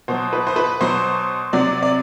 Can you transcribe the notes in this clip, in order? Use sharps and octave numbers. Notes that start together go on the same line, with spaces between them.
B2 F#3 C5
B4
C5
B4
B2 F#3 C5
C3 F#3 D5
D5